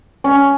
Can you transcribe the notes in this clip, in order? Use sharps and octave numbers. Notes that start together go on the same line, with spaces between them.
C#4